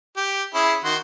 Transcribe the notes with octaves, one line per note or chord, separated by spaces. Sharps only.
G4
C#4 E4 G#4
D#3 F#4 C6